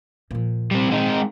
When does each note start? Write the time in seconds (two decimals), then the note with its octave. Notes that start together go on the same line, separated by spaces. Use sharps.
0.31 A#2 F3
0.71 G3 C4
0.91 G#3 C4 D#4